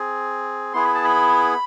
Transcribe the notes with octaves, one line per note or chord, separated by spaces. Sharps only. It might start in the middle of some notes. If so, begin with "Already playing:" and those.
Already playing: C4 G#4
B3 E4 G#4 C6
B5
A5
B5